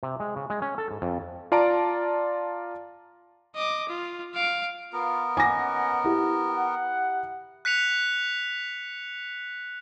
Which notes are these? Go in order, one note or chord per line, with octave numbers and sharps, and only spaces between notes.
C3
G#3
C#3
G#3
C#4
A4
G#2
F2
F4 D5 A5 A#5 D7
D#5 D6
F4
F5 D7
B3 F4 A#4
C#4 D#5 F#5 G#5 D6 A#6
E4 G4
F#5
F#6 B6 C#7 F7